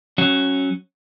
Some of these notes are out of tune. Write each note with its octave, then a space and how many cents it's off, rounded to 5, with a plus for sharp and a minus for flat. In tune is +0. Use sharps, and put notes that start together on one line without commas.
F#3 +5 C#4 -10